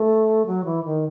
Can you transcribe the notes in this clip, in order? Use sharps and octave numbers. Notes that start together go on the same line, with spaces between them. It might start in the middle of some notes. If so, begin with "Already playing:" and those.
Already playing: A3
F#3
E3
D#3